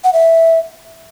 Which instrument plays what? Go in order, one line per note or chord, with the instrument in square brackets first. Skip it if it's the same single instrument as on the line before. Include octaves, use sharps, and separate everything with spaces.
[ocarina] F#5
E5